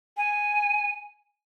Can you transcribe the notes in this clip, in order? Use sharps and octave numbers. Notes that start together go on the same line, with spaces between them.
G#5